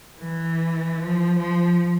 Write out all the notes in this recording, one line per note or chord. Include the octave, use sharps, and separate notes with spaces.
E3
F3
F3